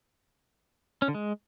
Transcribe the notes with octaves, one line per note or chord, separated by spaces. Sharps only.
C#4
D3
G#3